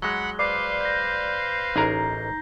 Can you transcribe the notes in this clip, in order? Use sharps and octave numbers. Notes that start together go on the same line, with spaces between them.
F#3 G#3 F#5 B5 F#6 G7
B4 C5 D5 F5 C7
G6 A#6
A1 D#4 G#4 A#4 A#5